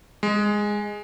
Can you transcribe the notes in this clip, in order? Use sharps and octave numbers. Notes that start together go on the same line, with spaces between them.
G#3